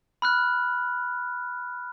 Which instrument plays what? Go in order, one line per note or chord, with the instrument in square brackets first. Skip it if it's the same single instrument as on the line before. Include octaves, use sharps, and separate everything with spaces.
[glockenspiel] B5 F6 F#6